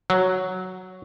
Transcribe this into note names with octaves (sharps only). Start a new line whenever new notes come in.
F#3